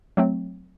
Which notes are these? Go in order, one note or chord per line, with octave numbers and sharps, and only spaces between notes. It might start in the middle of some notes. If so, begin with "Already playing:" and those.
F#3 A3 C4